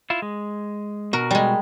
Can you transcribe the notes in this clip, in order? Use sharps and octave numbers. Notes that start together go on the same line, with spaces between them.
E4 F4
G#3
B2 F#4 A#4
G3 G#3